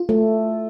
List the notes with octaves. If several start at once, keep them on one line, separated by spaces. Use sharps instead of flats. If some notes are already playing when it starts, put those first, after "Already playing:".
Already playing: F4
A3